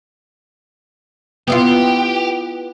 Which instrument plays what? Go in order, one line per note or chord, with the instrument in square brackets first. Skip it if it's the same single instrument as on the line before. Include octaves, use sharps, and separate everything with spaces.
[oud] B3 E4 F4 [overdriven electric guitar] G4